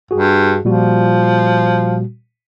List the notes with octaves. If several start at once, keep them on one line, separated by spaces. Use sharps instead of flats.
G2 F#4 G#4
A#2 F3 G3 F#4